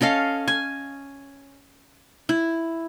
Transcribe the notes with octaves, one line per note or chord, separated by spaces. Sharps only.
C#4 A4 D#5 F5
G#5
E4